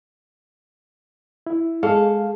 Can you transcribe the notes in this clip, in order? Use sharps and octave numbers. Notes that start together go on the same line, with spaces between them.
E4
G#3 G#4 A4 F5